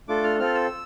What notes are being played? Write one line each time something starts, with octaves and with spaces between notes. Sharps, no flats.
A3 D4 F4 A4 D6
F6
C4 F4 A4 F6
E6